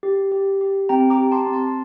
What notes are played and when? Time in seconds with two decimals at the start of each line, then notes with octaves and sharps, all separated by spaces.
0.03 G4
0.32 G4
0.61 G4
0.89 C4 G5 A#5
1.10 A#5 D6
1.18 G4
1.32 A5 C6
1.47 C4
1.53 A5 C6